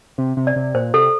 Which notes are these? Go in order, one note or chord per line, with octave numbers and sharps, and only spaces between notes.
C3
C3
D5
C3
A#2 C5
C3 A4